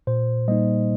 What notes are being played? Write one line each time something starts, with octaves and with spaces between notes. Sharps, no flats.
A#2 C5
G3 A#3 D#4 D#5